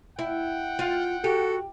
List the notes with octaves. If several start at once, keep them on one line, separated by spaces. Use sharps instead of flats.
E4 F#5 G5
F4
F#4 G4 A4